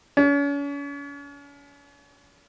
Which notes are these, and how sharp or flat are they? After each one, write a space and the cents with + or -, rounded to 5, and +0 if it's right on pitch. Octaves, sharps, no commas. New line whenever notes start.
C#4 +40